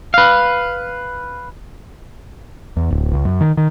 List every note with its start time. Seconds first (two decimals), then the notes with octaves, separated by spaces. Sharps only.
0.14 B4 F5
2.77 E2
2.91 D1
3.13 C#2
3.25 F#2
3.41 D#3
3.57 D#3